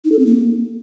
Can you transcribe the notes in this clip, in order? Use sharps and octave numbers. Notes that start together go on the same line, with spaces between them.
D#4
A4
C4
A#3